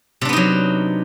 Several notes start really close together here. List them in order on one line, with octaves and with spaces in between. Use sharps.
C3 D4 B3 D#4 F#3